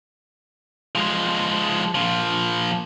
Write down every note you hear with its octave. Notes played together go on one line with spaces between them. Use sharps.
F3 G#3
A#2 F3